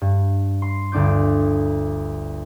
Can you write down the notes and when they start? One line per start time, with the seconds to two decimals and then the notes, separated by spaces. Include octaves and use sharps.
0.01 G2
0.62 C6
0.92 G1 D2 D4 D6 G6